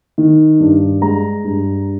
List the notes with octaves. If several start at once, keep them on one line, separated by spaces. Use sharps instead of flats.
D#3
G2
G#3 A#5
G2